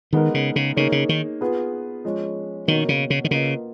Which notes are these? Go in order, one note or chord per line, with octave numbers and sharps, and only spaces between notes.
D#3 G#3 B3 D#4 A#4
C#3
C#3
C#3 A#3 D#4 G#4 C#5
C#3
D#3
B3 F4 G#4 B4
F3 G#3 C#4
B2 D#3 A#3 C#4 F#4 A#4
C#3
C#3
D#3
C#3 A#3 F4 B4 D#5